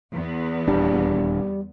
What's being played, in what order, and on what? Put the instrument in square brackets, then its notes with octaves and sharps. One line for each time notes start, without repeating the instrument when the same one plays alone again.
[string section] E2 B3
[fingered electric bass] D#1 D4 [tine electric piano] G3